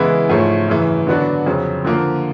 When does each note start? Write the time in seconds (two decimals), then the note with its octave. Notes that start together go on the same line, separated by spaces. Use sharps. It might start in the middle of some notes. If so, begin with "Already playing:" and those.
Already playing: C#3 E3 G#3 B3 E4
0.29 G#2 F3 A3 C#4 E4
0.68 F#2 C#3 E3
1.07 D3 F#3 B3 D4 F#4
1.46 F2 C#3 F#3
1.85 D3 F3 A#3